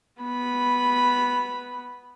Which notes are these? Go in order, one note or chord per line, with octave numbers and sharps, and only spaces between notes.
B3 B5